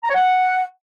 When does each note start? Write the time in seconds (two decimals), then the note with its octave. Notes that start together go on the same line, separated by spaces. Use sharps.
0.04 A#5
0.09 C#5
0.15 F#5